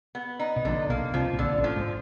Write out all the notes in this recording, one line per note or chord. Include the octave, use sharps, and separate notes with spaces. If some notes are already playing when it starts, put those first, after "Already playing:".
B3
D#4
B2
A#1 A#2 D3
B1 B2 A#3
C2 C3 F3
B2
A#1 A#2 D3
A1 A2
F3
G#2